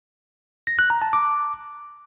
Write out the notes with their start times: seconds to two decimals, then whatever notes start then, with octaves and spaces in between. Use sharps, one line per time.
0.67 A#6
0.79 F#6
0.90 A#5
1.02 A5
1.13 D6